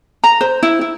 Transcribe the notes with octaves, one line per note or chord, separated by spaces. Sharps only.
A#5
C5
E4
E4